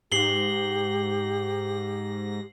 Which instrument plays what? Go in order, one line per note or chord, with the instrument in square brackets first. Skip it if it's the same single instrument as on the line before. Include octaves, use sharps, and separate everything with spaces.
[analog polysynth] G#2 A#6 [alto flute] G4 [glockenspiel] C7 F#7 G7